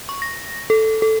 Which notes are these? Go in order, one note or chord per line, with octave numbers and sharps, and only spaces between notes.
C#6
A#6
A4
A4